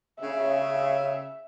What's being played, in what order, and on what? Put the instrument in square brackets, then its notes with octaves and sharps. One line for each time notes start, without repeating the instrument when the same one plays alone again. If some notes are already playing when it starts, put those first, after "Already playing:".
[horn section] C#3 [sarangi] E5